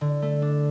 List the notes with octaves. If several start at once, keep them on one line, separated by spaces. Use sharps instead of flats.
D3
A3
D4